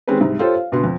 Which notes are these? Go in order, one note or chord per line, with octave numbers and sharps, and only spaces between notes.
D#3 G#3 C4 C#4 G4 B4
C2 G#2
F4 G4 A4 C5 C#5
F5
D2 B2 B4 C6
F2